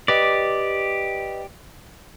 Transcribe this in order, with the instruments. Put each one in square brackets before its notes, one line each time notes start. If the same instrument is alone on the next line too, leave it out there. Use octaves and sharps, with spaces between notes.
[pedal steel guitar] G4 D5 [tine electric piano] B4 D#5